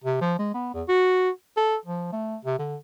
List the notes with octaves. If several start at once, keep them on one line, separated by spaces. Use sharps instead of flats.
C3
F3
G#3
B3
E2
F#4
A4
F3
A3
C3
D3